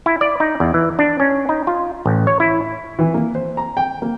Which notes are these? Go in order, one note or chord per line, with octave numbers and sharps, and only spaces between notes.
E4
D5
D#4
E2
E3
D4
C#4
D#4
F4
A1
C#5
E4
E3
A#3
C5
A#5
G5
A#3